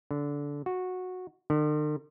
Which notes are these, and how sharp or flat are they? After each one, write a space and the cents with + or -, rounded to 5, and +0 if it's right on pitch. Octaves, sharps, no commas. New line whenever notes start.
D3 -20
F#4 -15
D3 +45